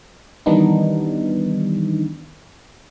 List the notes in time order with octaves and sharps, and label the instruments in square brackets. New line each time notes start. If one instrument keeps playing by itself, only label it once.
[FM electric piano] D#3 E3 G3 B3 D4 D#4